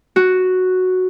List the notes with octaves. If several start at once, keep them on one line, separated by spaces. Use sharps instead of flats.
F#4